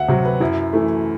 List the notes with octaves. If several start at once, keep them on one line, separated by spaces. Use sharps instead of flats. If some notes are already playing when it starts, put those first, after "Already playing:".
Already playing: D2 E5 F#5
C3 F#3
B4
F#2 E4
E3 A3